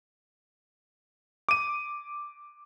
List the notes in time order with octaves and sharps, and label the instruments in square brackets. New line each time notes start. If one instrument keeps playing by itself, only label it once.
[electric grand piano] D6 D#7